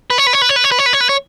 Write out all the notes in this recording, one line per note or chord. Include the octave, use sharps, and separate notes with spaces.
B4
C#5
B4
C#5
B4
C#5
B4
C#5
B4
C#5
B4
C#5
B4
C#5